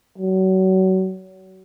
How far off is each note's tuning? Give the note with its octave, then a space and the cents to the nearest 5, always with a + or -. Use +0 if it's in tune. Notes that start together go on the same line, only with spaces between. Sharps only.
F#3 +30